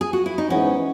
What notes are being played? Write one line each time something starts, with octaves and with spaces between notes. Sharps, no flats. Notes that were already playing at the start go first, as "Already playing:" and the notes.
G#4
F#4
E4
D#4
G#2 E3 B3 C#4